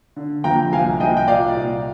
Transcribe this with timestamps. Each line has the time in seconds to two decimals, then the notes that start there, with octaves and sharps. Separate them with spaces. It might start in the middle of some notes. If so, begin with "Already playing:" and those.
0.16 D3
0.44 F2 G5 A#5
0.73 C2 F5 G#5
1.00 C2 D#5 G5
1.17 G5
1.28 A#2 D5 F5
1.57 C2